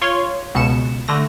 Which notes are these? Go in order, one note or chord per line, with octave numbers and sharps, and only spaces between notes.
F4 C#5 C6
C#2 B2 C#7 E7
D3 A3 A#6